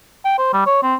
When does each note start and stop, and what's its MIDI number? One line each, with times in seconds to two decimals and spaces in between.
0.25 0.38 79
0.38 0.50 72
0.53 0.63 55
0.66 0.82 73
0.83 0.95 60